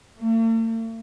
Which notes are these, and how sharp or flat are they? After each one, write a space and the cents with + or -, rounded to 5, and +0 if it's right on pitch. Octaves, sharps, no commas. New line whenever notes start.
A3 +45